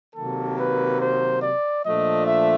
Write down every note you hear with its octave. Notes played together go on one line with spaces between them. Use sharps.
C3 D#3 F#3 A#3 A4
B4
C5
D5
A#2 F3 A3 D4 D#5
E5